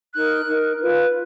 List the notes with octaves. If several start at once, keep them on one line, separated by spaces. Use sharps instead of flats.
D#4 A#4 F#6
D#4 A#4
F4 B4